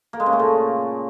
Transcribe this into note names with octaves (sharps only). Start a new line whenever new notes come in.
A#3
G#3
C#3
A3
A#2